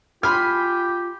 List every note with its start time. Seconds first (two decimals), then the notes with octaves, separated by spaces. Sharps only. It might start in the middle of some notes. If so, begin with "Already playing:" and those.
0.23 F4 G4 G#5 B5 C6 F6